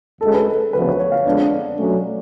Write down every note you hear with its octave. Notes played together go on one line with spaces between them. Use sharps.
D2 D3 G#3 C#4 A4
B4
A4
D2 C#3 F3 B3 B4
C#5
C#5
F5
F2 D3 G#3 B3 D4 D5
B2 F#3 A3 C#4